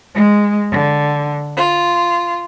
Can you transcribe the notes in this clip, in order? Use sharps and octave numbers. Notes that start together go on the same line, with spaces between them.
G#3
D3
F4